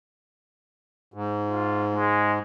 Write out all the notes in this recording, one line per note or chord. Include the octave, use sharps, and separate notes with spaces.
G#2
F4
G#3